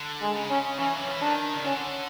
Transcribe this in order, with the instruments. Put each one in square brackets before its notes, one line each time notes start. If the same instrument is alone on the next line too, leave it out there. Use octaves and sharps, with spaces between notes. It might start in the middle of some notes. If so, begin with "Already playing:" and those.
Already playing: [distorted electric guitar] D3
[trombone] G#3
[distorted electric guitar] C#3
[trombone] C#4
[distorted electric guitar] E3 [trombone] C#4
[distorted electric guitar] F#3
F3
E3
[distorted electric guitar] D#3 [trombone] D4
[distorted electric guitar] C#3
[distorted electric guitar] D3 [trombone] C#4